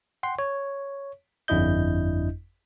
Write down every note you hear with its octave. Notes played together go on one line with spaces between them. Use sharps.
F#5 G5 C6
C#5
G1 F2 D4 E4 D#5 G6